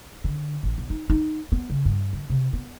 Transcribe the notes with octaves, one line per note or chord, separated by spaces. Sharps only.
D3
A1
B1
D#4
D#4
B3
C#3
G2
D3
C3
B3